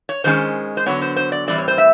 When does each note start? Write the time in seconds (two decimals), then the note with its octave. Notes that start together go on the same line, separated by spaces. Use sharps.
0.09 C#5
0.24 D#3 G#3 C#4 C5
0.77 C5
0.86 D3 F#3 B3 C#5
1.02 C5
1.16 C5
1.32 D5
1.48 A2 E3 G3 C4 D5
1.58 C#5
1.68 C5
1.78 E5